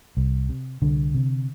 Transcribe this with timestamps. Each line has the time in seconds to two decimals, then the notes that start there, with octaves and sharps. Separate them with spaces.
0.17 C2
0.49 C3
0.82 C2 D3
1.15 C3